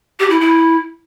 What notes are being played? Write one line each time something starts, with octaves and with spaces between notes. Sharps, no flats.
G4
E4
E4